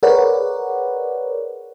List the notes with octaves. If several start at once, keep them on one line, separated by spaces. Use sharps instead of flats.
G#4 A#4 B4 C#5 D5 F#5